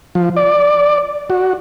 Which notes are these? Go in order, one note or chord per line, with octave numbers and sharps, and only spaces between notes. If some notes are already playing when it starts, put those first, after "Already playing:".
F3
D5
F#4